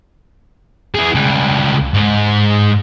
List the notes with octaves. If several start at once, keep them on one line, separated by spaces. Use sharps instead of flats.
E4 G#4
C#2 G3
G#2